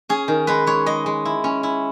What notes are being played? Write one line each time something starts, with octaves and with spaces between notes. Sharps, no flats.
C#4 G#4
D#3
G#3 B4
G#3 C#5
G#3 D#5
G#3
E4
C#4
E4